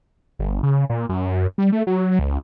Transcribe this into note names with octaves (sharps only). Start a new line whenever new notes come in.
G1
C#3
A#2
F#2
G3
A3
F#3
C#2